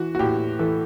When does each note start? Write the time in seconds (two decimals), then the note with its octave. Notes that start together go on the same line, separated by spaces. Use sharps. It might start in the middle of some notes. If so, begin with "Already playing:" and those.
Already playing: E3 F#4
0.15 F#4
0.19 A2 G4
0.59 E3 A4